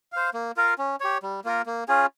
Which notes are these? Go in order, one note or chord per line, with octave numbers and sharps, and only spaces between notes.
C5 F5
A#3
F4 A#4 F5
C#4
G4 C#5
G3
A#3 F4 A#4
A#3
C#4 F4 G#4